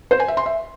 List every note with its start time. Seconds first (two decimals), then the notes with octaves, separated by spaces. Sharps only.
0.11 C5
0.20 G#5
0.28 E5
0.37 C6
0.46 E5